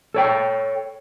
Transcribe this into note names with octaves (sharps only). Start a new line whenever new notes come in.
A4 C#5 G5